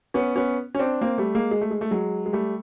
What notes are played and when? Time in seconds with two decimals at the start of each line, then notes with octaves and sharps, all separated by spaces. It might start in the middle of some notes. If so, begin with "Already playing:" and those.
0.14 B3 C#4
0.36 B3 C#4
0.75 C#4
0.79 C4 D4
1.01 A#3 C4
1.18 G3 A3
1.35 G#3 A#3
1.51 G#3
1.61 A3
1.71 G#3
1.81 A3
1.91 F#3 G#3
2.26 G#3
2.33 G3 A3